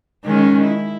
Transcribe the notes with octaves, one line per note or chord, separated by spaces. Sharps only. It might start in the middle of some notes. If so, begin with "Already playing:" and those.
D#3 G#3 C#4
E4